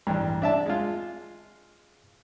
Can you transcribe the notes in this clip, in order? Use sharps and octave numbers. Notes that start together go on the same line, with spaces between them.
A1 G2
D4 E5 A5
G#3 F4